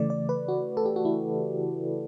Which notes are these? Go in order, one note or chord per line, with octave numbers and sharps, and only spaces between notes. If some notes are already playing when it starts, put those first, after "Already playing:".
Already playing: C#3 E3 A3 D5
D5
B4
F#4
A4
G4
F#4
E4